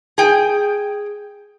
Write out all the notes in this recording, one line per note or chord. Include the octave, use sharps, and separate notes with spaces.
G#4 G5